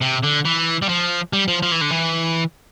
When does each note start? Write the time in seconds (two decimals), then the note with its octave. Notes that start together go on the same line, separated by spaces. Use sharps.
0.01 C3
0.23 D3
0.45 E3
0.82 G3
0.89 F3
1.33 G3
1.48 F3
1.63 F3
1.72 E3
1.81 D3
1.91 E3